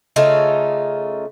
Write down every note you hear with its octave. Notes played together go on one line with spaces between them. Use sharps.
C#3 A3 D#4 F4